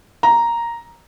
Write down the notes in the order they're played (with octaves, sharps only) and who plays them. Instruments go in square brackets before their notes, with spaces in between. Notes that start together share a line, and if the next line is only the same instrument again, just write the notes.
[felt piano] A#5